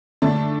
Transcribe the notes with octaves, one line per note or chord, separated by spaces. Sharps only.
D3 A3 D4 A5